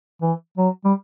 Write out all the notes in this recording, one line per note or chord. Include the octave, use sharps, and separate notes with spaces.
E3
F#3
G3